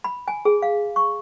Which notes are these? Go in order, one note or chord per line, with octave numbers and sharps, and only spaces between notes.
B5
G#5
G#4
F5
C#6